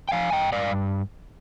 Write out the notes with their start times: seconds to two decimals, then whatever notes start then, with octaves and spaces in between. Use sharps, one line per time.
0.09 G5
0.12 F3 F5 G#5
0.32 G2 D#5 G5
0.52 G2 D5 F5